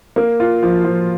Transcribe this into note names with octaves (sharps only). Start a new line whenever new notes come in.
A#3
F4
F3
F3